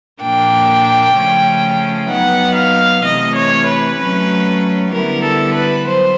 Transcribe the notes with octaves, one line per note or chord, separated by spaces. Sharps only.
A#2 F3 A#3 D4 G5
C#3 F3 A3 C#4
F#3 B3 D#4 F#5
F5
C3 E3 A3 D#5
C#5
B4
F#3 A3 C#4
D3 G3 B3 E4 A#4
A4
B4
F#3 C5